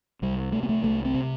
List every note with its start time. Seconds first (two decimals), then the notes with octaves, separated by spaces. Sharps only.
0.22 C2 G3
0.52 C3 A3
0.63 B3
0.69 A3
0.83 C2 A3
1.05 C4
1.14 C3